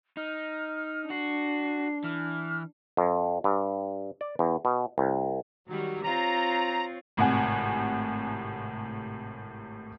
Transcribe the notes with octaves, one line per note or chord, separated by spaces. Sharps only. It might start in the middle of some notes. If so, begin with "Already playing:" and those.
D#4 F6
D4 F#4 C7
E3 F6
F2
G2
D5
E2
B2
C2
D#3 F#3 G3
C4 F4 C#5 A#5
G#1 A2 C3 F#5 G#5